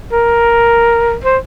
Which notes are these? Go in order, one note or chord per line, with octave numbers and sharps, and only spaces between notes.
A#4
C5